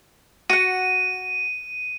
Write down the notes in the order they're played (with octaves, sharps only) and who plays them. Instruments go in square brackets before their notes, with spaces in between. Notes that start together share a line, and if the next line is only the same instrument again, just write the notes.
[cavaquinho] F#4 F#5 [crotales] D#7